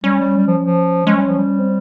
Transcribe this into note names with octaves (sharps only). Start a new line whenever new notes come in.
G3 C#4
G3
G3
F3
F3
G#3 C#4
G3
F3
G3
C4